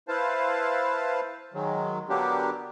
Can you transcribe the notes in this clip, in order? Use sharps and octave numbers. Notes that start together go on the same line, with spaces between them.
E4 B4 C5 F5 A5
D#3 F#3 G#3
D3 F#3 A#3 B3 D4 G4